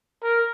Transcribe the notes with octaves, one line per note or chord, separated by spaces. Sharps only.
A#4